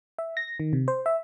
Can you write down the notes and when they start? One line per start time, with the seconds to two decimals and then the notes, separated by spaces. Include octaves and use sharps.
0.19 E5
0.37 A#6
0.60 D#3
0.73 C3
0.88 C5
1.06 E5